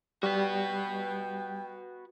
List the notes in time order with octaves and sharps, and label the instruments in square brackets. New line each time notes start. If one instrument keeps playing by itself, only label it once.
[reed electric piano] G3 [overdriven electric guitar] F#4 B4 [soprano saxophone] G5